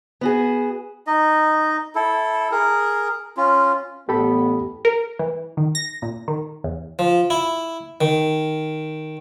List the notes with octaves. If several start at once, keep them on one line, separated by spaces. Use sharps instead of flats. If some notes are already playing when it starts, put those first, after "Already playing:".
B3 F#4 G#4
D#4 D#5
E4 A4
G#4 A#4
C#4 F4
A1 B3 G4 A4 B5
A#4
E3
D#3
A#6
A#2
D#3
E2
F3
E4
D#3